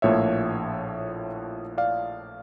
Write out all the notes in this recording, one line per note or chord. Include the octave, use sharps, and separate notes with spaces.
A#1 A2 F3 A#3 C#5 E5
D5 F5